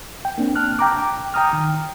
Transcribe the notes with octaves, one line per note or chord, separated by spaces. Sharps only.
G5
A#3 C4 D4
A5 F6 F#6
G5 A#5 D6
G5 A#5 D#6 F6
D#3